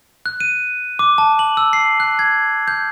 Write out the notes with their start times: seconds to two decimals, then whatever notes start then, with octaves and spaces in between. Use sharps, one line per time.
0.26 F#6
0.40 D#7
0.99 D6
1.18 A5
1.39 F#7
1.57 E6
1.73 C7
2.00 F#6
2.19 G#6
2.68 G6